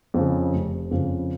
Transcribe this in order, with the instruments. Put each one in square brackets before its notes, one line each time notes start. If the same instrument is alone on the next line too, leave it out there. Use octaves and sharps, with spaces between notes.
[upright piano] F2 C#3
F1
F2 C#3